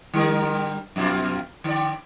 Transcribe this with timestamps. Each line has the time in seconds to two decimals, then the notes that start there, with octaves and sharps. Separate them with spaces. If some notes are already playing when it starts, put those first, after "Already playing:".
0.14 D3 G3 A#4
0.96 F2 B2 F4
1.64 D3 D5